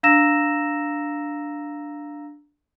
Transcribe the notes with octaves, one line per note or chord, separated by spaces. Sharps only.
D4 F5 A#5 E6 A#6 E7